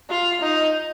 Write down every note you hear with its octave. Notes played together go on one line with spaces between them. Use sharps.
F4
D#4